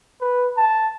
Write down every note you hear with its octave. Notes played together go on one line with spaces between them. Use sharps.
B4
A5